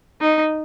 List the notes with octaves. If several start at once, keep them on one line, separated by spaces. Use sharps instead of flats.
D#4